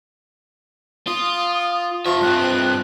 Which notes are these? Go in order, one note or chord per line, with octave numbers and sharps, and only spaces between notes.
F4 D#6
F2 F3 E5 C#6
G2 C4 F#6